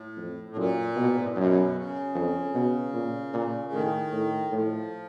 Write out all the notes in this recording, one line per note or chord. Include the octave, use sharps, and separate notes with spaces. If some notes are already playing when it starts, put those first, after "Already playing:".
Already playing: A2
F2
A2
F#2 A#2
B2
G#2
A2
A#2
F#2 B2
C#3
F2
B2
A#2
A#2
A2 D#3
A2
A2 F3